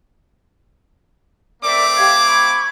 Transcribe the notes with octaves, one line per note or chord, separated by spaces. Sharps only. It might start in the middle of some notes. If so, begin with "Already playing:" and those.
A3 C4 A#4 D5 E5 D6
G4 F5 G#6
B5 C#6 G#6